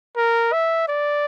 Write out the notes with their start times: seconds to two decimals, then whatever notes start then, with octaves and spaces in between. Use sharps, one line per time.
0.17 A#4
0.53 E5
0.88 D5